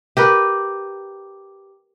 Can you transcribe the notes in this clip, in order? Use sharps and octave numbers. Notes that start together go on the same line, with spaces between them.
G4 A#4 B4